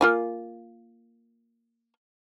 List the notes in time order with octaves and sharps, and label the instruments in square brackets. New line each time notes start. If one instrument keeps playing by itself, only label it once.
[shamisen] A#3 F4 G#5